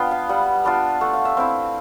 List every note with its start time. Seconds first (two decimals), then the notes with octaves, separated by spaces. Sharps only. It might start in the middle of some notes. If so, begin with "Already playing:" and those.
Already playing: B3 D4 F4 G5
0.11 F5
0.29 G3 F#5
0.65 B3 D4 F4
1.01 A3 F#5
1.13 F5
1.25 E5
1.37 C4 E4 F5